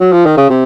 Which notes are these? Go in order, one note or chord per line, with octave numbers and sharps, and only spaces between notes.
F#3
F3
D#3
C#3
C3